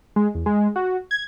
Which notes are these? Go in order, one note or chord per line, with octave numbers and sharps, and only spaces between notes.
G#3
E2
G#3
F#4
G#6